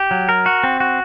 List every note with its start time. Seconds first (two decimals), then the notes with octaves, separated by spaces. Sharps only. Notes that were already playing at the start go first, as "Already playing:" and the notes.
Already playing: G4
0.11 F#3
0.29 A#4
0.46 F#4
0.64 C4
0.80 F#4